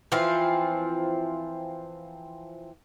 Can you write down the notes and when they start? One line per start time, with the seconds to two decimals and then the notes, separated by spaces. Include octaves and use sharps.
0.12 E3 F3 C4 F4